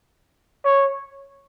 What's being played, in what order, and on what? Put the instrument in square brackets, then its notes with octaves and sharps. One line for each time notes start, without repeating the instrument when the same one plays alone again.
[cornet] C#5